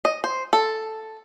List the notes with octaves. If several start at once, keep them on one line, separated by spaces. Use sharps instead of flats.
D#5
C5
A4